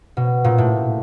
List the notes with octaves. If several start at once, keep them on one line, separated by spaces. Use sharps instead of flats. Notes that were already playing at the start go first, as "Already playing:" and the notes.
B2
A#2
A2